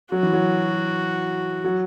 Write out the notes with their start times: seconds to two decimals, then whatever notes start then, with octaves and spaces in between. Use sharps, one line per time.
0.12 F#3 F#4
0.23 E3
0.33 F#3
1.64 F#3